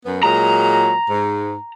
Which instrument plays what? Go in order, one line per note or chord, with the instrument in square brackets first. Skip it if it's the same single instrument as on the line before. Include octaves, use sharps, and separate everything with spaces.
[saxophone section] F#2 B3
[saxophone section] A#2 F#3 G#3 [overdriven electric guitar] A#5
[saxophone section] G#2